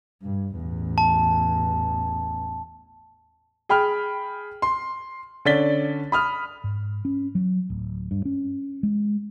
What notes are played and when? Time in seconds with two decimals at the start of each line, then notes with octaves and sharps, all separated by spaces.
0.22 G2
0.57 A1 E2
0.98 A5
3.69 G#4 G5 B5 F6
4.62 C6
5.45 D3 C#4 D5 A6 B6 G7
6.12 B5 D#6 F6
6.64 G#2
7.05 C#4
7.35 F#3
7.70 D1
8.11 G2
8.25 C#4
8.83 G#3